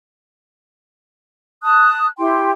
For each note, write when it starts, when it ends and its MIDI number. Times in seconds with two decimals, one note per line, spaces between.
1.63 2.06 81
1.63 2.06 87
1.63 2.06 90
2.18 2.52 64
2.18 2.52 67
2.18 2.52 79
2.18 2.52 84